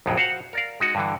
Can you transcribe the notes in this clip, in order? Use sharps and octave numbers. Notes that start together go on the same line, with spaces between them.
A#1 F2 A2 C#3 F#3
F#4 C5 F5 F#5
A#4 D5 F5
G#3 D#4 F#4
G2 D3 E3